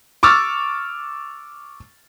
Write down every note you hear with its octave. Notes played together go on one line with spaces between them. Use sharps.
C#6 D6 E6 F6 A6